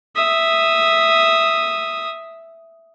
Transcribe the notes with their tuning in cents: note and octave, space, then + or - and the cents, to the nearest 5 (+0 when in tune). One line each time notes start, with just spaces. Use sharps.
E5 +0 D#6 +0